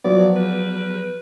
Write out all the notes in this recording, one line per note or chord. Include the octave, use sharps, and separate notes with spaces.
F3 F#3 B3 D5
B4